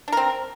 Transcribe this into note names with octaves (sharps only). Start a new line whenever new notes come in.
C4 D4 A#4